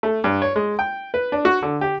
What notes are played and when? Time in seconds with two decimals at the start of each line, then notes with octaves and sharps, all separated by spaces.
0.03 A3
0.24 G2
0.42 C#5
0.56 G#3
0.79 G5
1.14 B4
1.32 D4
1.45 F#4
1.62 D3
1.81 G4